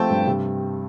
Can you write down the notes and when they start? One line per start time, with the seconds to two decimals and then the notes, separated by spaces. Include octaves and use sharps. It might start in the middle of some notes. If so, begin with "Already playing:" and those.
Already playing: F3 A3 C4 G5 A5
0.10 G2
0.27 C3